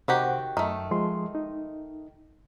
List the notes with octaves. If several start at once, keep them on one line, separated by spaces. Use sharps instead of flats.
C3 D#3 F#4 G4 C5 F#5
F#2 D#3 A3
F3 G#3 C6
D#4